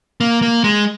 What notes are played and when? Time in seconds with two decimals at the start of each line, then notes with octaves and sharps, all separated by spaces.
0.20 A#3
0.42 A#3
0.64 G#3